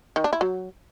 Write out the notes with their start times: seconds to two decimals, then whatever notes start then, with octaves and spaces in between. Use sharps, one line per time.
0.16 D#3
0.24 D4
0.33 E4
0.41 F#3